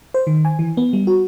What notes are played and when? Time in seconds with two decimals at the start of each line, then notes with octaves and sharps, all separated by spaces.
0.14 C5
0.27 D#3
0.45 G#5
0.59 E3
0.77 B3
0.93 G3
1.07 F#4